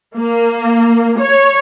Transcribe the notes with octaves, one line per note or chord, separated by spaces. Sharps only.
A#3
C#5